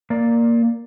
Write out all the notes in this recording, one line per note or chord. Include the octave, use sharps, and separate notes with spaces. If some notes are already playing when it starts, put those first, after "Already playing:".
A#3 D5